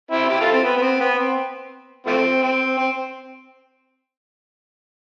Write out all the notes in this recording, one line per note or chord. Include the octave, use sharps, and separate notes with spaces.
C4 E4
E4 G4
F4 A4
C4
B3
B3
C4
B3
C4
F3 A3 C4
C4
C4